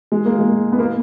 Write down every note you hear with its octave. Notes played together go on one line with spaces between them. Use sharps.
G#3
A#3
G#3
B3
A#3